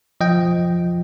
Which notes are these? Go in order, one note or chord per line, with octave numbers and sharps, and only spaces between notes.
F3 D#5 G5